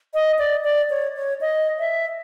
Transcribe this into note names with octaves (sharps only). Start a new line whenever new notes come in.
D#5
D5
D5
C#5
C#5
D#5
E5